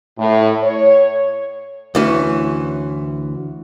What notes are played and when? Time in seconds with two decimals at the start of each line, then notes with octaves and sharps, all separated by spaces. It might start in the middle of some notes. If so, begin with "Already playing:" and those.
0.18 A2
0.62 C#5
1.95 D2 E3 C#4